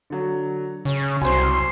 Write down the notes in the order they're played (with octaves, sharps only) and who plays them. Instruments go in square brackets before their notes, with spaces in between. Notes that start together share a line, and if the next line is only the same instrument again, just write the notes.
[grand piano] D3 F#3
[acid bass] C#3 [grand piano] C#5
[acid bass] C2 [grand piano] F#3 C4 [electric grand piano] C5 G#5 [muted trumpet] C6